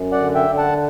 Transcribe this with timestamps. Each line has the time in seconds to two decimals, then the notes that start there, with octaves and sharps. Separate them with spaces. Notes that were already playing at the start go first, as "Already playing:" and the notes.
Already playing: F#2
0.12 D5 F#5
0.20 D3
0.35 E5 G5
0.50 D3
0.58 F#5 A5